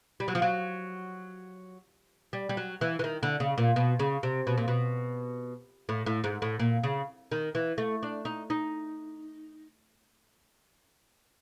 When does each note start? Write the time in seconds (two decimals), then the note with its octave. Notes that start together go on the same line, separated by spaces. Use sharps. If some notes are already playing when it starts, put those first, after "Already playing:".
0.20 G3
0.28 F#3
0.35 F3
0.42 F#3
2.33 G3
2.49 G3
2.57 F#3
2.81 E3
2.99 E3
3.04 D#3
3.23 D3
3.40 C#3
3.58 A#2
3.76 B2
3.99 C#3
4.23 C3
4.47 B2
4.58 A#2
4.68 B2
5.89 A2
6.06 A2
6.24 G#2
6.42 A2
6.59 A#2
6.83 C#3
7.32 D#3
7.55 E3
7.78 A3
8.03 D4
8.25 D#4
8.50 D#4